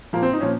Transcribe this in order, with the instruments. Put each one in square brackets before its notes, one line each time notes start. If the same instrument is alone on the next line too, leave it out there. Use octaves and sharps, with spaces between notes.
[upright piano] A#2 F3 A#3
C4
D#4
A#2 F3 C#4